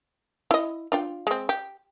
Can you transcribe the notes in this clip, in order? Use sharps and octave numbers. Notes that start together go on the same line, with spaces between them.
E4 D#5
D4 F4 G5
G#3 C4
G4